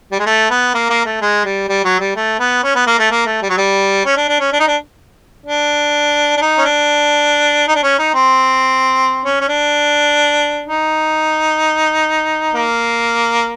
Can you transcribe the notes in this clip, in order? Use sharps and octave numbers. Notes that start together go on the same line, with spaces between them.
G3
G#3
A3
B3
A#3
A#3
A3
G#3
G3
G3
F#3
G3
A3
B3
C#4
B3
A#3
A3
A#3
A3
G3
F#3
G3
C#4
D4
D4
C#4
D4
D#4
D4
D4
D4
D#4
C#4
D4
D#4
D4
C#4
D#4
C4
C#4
C#4
D4
D#4
A#3